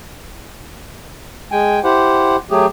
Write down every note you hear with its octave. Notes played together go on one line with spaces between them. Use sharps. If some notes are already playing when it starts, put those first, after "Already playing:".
G#3 G5 G#5
E4 G4 C5 F#5
F#3 A3 G4 G#4